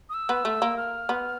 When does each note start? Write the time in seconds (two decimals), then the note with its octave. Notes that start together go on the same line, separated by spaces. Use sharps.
0.09 D#6
0.14 E6
0.29 B3
0.45 A3
0.62 A#3
0.77 F6
1.09 B3